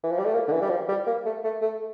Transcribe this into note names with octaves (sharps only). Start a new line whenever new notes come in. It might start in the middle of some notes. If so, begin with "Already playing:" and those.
E3
F3
G3
A3
A#3
D3
E3
G3
F3
G3
A#3
A3
A3
A3